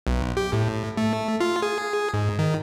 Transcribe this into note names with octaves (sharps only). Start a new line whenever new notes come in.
B1
G4
A2
A3
F4
G#4
G#2
D#3